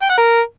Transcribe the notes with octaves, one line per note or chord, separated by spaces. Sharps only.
G5
F#5
A#4